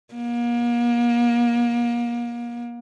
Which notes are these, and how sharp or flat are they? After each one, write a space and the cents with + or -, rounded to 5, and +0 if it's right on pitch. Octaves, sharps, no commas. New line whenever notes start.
A#3 +35